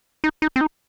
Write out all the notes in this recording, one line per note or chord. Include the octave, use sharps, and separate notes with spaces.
D#4
D#4
C4
D#4